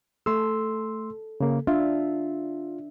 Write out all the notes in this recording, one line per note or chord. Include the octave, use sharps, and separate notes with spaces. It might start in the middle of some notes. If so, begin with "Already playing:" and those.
A3 A4 C6 E6
C#3 A#3
D4 F4 E5